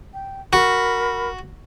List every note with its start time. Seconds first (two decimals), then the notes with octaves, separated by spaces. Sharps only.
0.13 G5
0.53 F#4 A#4 B5